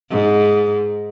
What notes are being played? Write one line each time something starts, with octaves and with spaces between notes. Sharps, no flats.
G#2